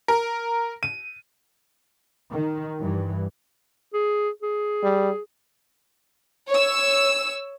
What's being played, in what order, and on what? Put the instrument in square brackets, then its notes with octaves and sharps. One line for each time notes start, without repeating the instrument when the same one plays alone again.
[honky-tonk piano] A#4
D#7
[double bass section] D#3
G2 E3
[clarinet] G#4
G#4
[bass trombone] G3
[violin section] C#5 E6